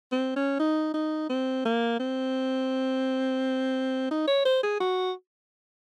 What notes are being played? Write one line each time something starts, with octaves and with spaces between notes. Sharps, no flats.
C4
C#4
D#4
D#4
C4
A#3
C4
D#4
C#5
C5
G#4
F#4